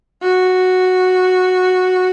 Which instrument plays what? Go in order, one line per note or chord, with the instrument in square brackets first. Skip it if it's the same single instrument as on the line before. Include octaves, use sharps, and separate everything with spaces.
[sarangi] F#4